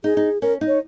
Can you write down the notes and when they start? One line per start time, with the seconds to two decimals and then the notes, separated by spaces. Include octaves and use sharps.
0.04 D#4 G#4
0.17 D#4
0.42 C#4 A#4
0.61 D#4
0.67 C#5